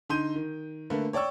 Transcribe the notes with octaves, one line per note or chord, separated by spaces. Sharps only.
D3 D#4 C6 G6 D#7
D#3
D3 A3 A#3 B4
C#5 D5 G5 C#6 E6